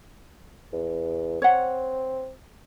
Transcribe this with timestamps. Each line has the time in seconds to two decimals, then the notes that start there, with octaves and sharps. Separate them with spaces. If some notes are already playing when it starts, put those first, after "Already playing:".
0.73 E2
1.42 C4 C#5 F#5